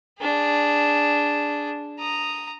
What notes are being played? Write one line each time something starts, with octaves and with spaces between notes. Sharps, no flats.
D4 G#4
A#5 D#6